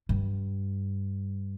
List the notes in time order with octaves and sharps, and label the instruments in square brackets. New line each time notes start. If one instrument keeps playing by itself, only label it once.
[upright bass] G2